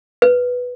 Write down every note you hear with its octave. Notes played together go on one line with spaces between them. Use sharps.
B4